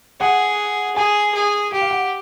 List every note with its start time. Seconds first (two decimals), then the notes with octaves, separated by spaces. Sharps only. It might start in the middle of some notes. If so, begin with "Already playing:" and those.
0.20 G#4 F#5
0.96 G#4 G#5
1.34 G#4
1.72 G4 G5
1.82 F5
1.91 F#5